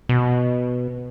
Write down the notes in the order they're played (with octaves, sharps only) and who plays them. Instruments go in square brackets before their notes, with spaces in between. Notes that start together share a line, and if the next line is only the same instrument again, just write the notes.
[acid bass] B2